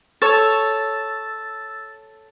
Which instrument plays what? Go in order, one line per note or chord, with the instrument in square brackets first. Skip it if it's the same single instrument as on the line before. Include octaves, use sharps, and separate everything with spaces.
[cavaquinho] A4 C#5 [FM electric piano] E6 A6